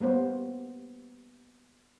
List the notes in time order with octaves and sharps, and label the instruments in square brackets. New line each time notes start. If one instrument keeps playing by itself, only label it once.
[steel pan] G3 A#3 B3 C5 C#5